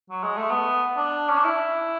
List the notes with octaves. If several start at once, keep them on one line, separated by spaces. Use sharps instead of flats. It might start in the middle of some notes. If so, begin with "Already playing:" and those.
F#3
G#3
A3
B3
D4
C#4
D4
E4